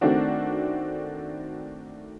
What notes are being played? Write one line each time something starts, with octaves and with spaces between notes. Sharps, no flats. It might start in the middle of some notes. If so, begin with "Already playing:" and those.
D#3 A3 C4 D4 F#4